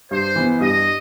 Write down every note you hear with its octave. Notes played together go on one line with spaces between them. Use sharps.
G2 C5
E3 B3
G2 D#5